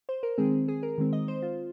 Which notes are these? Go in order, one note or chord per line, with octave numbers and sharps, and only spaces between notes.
C5
A#4
D#3 G#3 C4 G#4
G#4
A#4
D#3 G#3 C4
D#5
C5
F4